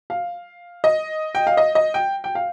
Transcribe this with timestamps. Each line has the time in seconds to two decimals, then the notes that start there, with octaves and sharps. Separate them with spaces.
0.10 F5
0.84 D#5
1.35 G5
1.47 F5
1.57 D#5
1.75 D#5
1.94 G5
2.24 G5
2.35 F5